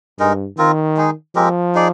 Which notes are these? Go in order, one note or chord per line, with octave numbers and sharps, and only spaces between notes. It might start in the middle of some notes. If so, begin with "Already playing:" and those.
G2 G#3 D#4 A#4
D#3 C4 F4 A#4
G#3 D#4 G#4
F3 G#3 C4 G4 A#4
D#4 G#4 D5